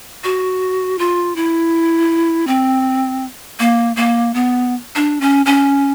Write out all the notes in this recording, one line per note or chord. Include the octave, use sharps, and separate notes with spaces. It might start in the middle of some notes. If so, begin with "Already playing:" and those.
F#4
F4
E4
C4
A#3
A#3
B3
D4
C#4
C#4